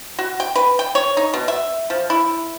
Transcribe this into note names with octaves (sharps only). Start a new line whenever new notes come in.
F#4
G5
B4
G5
C#5
D#4
B2
E5
F3
E4